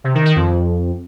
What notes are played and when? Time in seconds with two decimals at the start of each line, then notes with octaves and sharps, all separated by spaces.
0.04 C3
0.15 D#3
0.25 D#3
0.36 F2